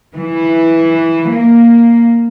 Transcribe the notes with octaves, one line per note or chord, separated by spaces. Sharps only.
E3
A#3